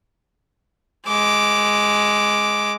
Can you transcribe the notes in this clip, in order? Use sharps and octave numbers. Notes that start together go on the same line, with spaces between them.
G#3 D6